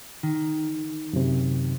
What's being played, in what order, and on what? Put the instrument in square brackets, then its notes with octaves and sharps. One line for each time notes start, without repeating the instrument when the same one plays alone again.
[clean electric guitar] D#3
[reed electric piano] F#2 C3